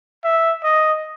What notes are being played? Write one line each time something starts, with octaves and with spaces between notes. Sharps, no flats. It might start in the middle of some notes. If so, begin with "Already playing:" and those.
E5
D#5